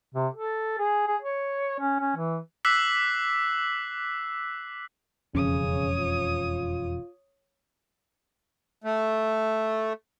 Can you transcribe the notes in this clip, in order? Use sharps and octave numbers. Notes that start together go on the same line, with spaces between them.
C3
A4
G#4
G#4
C#5
C#4
C#4
E3
D6 E6 F#6 B6 C7 F#7
E1 F2 C#3 C#4 C#5 D#6
F4
A3